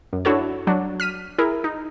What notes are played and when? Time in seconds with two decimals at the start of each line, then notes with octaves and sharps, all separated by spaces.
0.13 F#2
0.25 D4 E4 F#4 A4 C#5
0.67 F#3 D4 F#4
1.00 F6 B6 D#7
1.38 E4 G#4 A#4
1.64 D#4